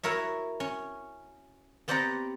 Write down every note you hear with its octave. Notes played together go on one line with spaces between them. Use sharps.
E4 F#4 A#4 C#5 E5
C#4
B3 C4 G4 D5 F#5 A#5